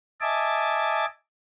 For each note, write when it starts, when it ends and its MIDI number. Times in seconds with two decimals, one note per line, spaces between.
0.21 1.05 75
0.21 1.05 76
0.21 1.05 80
0.21 1.05 81
0.21 1.05 86